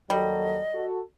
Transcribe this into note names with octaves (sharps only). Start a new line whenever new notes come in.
D#2 F#3 G3 A4 D#5
F#4 A4